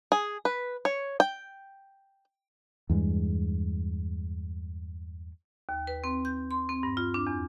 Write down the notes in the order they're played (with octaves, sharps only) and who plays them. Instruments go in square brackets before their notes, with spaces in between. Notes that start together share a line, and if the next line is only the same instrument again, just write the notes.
[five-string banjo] G#4
B4
C#5
G5
[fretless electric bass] E2 G2 G#3
[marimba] D#2
B4
C4
G6
C6
C4
G2
F4
D4
E2